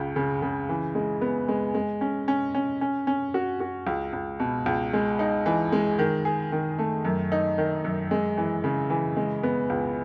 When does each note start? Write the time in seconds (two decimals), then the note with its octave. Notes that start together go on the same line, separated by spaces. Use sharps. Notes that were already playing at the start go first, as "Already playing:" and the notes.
Already playing: C#2 C#3
0.16 C#3
0.42 C#3
0.69 E3
0.95 G#3
1.21 B3
1.48 G#3
1.75 G#3
2.01 C#4
2.28 C#4
2.55 C#4
2.81 C#4
3.07 C#4
3.34 F#4
3.60 F#4
3.87 C#2
4.13 C#2
4.40 B2
4.66 C#2
4.93 G#3
5.19 D#4
5.46 E3
5.72 G#3
5.99 D#3
6.25 G#4
6.52 D#3
6.78 A3
7.05 F#2
7.32 D#4
7.58 D#3
7.85 F#2
8.11 G#3
8.37 E3
8.64 C#3
8.90 E3
9.17 G#3
9.43 B3
9.70 C#2